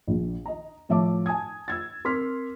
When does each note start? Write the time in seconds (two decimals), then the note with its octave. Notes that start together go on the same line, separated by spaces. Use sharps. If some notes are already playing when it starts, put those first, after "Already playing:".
0.08 A#1
0.46 D#5 A#5
0.89 A2 F3 C#5 E5 A5 D6
1.26 G#5 A5 D#6 G#6
1.68 E6 G#6 A6
2.05 C4 A#4 C6 D6 F6 B6